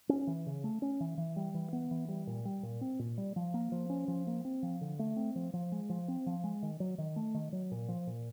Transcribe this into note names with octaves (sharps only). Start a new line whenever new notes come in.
C#4
E3
C#3
A3
C#4
E3
E3
G3
E3
B3
E3
G3
A#2
G3
A#2
C4
A#2
G3
F3
A#3
F3
C#4
F3
A#3
C4
F3
D3
A3
C4
F3
F3
G#3
F3
C4
F3
G#3
D#3
F#3
D#3
A3
D#3
F#3
A#2
F3
A#2